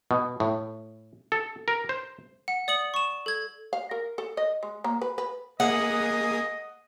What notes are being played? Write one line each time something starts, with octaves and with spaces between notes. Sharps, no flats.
B2
A2
A4
A#4
C5
F#5
D5 D#6 C#7 F#7
C#6 E7
A4 G#6
F5
A#4
A4
D#5
G#3
A#3
B4
B4
A#3 G#4 D#5 F#5 D#6